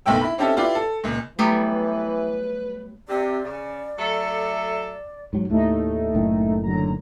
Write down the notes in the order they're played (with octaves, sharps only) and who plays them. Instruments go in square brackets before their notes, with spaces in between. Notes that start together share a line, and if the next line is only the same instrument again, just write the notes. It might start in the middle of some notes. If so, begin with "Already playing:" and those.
[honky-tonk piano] F#1 B1 A3 B3 G5 E6
E4 B5
C4 C#4 D#4 G4 A4 E5
E4 F4 G4 B4 D5
A4
C#2 A#2
[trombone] E3 [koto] F#3 G3 B3 [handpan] A3 [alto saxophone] B4
[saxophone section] C3 [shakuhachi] D5
[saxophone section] C#3
F#3 A3 A4
[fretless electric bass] G#2 F#3
[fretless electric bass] D#2 A2 [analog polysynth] A3 D#4
[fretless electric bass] F#1 A2 D#3
[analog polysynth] D3 F#3 A#5